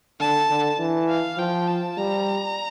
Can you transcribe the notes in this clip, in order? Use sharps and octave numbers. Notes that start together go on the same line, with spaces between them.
D3 A5
D3
E3
F5
F3 G5
A5
G3 A#5